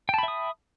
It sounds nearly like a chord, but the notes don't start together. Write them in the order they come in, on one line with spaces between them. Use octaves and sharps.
G5 A5 B5 E5 D#6